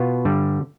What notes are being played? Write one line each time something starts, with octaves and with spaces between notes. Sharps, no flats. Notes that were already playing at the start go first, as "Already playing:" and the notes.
Already playing: B2 B3 F4
G2 D3 G3